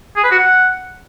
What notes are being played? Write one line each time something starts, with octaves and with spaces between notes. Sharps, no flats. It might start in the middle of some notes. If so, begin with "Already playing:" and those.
G#4
B4
F#4
F#5